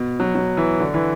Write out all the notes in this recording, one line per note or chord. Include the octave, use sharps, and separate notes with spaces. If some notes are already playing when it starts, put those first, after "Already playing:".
Already playing: B2
F#3
F#3
E3
D3
E3